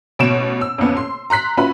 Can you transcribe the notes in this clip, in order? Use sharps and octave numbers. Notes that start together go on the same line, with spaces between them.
A1 B2 C#5 D7 E7
E6
A1 F2 B3 C#4
C6
A#5 C6 F#6 B6
C#4 F4 F#4 B4 E5 B5